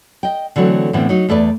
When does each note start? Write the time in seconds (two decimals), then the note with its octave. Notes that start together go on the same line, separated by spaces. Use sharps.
0.23 D#5 G5
0.56 D3 E3 F#3 A3 C4
0.93 A2 D3 E3 B3 C4
1.09 F#3 D#4
1.29 E2 A3 B4 D5